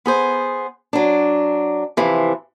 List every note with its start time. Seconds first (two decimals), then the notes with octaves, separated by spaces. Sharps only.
0.06 B3 G#4 C5
0.93 F#3 D4
1.97 C3 E3 F3